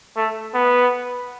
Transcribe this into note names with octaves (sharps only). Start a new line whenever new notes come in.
A3
B3